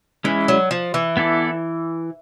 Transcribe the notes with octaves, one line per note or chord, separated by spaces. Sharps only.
E3 G#3 C#4 E4
F#3
F3
E3
B3 E4 A4 D5